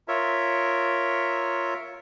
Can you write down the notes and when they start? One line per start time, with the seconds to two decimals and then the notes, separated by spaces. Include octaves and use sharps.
0.08 F4 A#4 C#5 E5